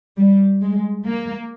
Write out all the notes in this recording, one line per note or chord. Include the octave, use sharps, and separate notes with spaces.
G3
G#3
A#3